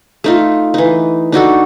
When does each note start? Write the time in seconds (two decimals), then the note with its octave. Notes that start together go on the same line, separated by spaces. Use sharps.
0.24 A3 D#4 F4
0.74 E3 D#4
1.32 D4 D#4 F#4 A4